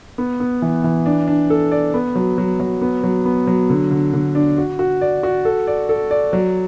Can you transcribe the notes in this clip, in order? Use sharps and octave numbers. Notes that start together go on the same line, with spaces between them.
B3
B3
E3
E3
D4
D4
A4
D5
B3
F#3
F#3
F#3
B3
F#3
B3
F#3
D3
D3
D3
D4
F#4
F#4
D5
F#4
A4
D5
A4
D5
F#3